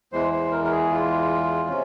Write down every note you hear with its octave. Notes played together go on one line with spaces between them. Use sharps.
E2 E3 G#3 C5
C5
A#4
A#4
G#4
F4
C3 C#4